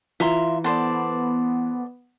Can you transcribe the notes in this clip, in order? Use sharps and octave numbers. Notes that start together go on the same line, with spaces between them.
E3 F4 E5 A#5 C6
B3 A4 C5 D5